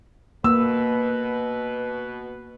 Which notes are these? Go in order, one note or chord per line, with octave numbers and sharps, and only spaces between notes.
B2 A#3 B4 E6